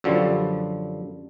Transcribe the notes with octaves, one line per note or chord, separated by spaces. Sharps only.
F#2 D3 F3 G3